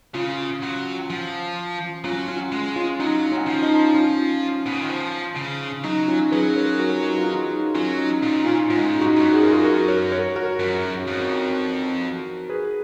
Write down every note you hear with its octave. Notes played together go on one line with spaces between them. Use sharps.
C#3 C#4 F4
F#3
F3
F#3 C#4 F4
C#4 F4
G#3
C#4 F4
F#3 D#4
D#4
C#4
F3
D#4
C#4 F4
B2
C#3
D#3
F3
C#3
F#3 D#4
C#4 F4
F#3 G#4 B4
A#4 C#5
F#4 A#4
D#4 F#4
F4
D#4
D#4
F#3 C#4 F4
D#4
A#2 D#4
C#4 F4
G#2 C#4 F4
D#4 F#4
F#2
G#4
A#4
F4 G#4
F#4 A#4
A#4 C#5
A#4 C#5
F#4 A#4
F#2
F2
G#4 B4